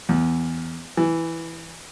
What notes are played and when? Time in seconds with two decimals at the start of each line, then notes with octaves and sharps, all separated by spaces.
0.09 E2
0.97 E3